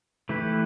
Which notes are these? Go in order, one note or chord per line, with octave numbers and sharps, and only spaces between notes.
E3 A3 E4 G4 B4